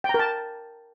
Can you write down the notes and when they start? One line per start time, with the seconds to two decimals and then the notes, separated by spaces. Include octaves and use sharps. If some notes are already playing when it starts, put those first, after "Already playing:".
0.04 G5
0.09 A#5
0.14 A#4
0.19 A5